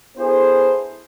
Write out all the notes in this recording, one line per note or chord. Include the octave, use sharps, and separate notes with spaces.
B3 D4 E4 G#4 A4 C5